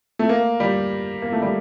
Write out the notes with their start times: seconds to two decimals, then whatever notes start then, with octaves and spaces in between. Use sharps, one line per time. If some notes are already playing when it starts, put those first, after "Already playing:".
0.19 A3
0.29 A#3
0.60 G3
1.22 A#3
1.33 A3
1.42 G3